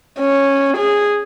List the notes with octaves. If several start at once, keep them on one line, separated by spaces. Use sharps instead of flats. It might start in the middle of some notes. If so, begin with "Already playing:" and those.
C#4
G#4